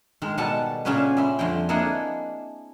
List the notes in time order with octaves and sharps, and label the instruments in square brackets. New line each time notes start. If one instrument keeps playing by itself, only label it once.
[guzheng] D#3 G#3
B2 G3 A4 F#5 A5 A#5
A#2 C#3 B3 C#4 G#4 B4
G3 E5 C6
F2 D3 A3 C5 G5
A#3 D4 E4 G#4 D#5 F#5